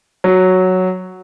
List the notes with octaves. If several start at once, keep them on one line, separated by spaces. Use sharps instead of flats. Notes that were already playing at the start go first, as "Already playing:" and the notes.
F#3